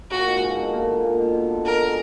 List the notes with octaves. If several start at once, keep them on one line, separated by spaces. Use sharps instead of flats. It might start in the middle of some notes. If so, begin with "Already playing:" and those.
A#2 F#4
G#2
A#2
D3
B2
A#2
A#2
A#2
B2
D3
D3
B2 A#4
G#3